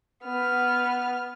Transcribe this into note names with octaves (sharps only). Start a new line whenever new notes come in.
B3 F6